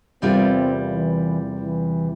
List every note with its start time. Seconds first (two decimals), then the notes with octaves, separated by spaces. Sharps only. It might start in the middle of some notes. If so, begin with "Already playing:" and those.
0.22 E2 C3 G3 A#3 C4 F4
0.90 E3
1.59 E3